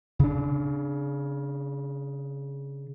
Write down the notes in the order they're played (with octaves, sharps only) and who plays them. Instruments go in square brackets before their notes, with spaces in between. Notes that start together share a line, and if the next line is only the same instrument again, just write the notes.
[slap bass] C#3 D4